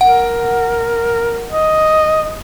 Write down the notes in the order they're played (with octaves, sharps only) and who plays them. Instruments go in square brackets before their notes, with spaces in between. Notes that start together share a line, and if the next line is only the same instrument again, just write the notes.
[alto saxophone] A#4 [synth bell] F#5
[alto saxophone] D#5